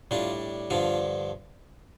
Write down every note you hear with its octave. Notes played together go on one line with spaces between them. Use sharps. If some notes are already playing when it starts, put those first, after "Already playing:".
A2 G3 D4 F4
G2 D3 F3 F4